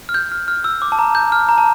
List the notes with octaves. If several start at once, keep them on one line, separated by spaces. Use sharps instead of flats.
F6
G6
F6
F6
E6
D6
A5
A#5
G6
F6
A#5
A5